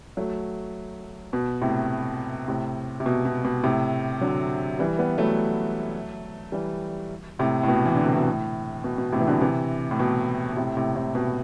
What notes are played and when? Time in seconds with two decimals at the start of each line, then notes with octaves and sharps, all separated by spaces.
0.17 F#3 A3
1.33 B2
1.62 A2 C3
2.48 A2 C3
3.00 C3
3.06 B2
3.25 B2
3.45 B2
3.64 A2 C3
4.21 D3 F#3
4.79 E3 G3
4.99 G3 B3
5.18 F#3 A3
6.52 E3 G3
7.39 A2 C3
7.63 A2
7.68 B2
7.85 E3
7.96 D3
8.06 C3
8.16 B2
8.26 A2
8.84 B2
8.98 B2
9.12 A2 C3
9.20 E3
9.27 B2 D3
9.41 C3 E3
9.91 A2
9.99 B2
10.53 B2
10.57 A2 C3
10.77 A2 C3
10.96 A2 C3
11.15 B2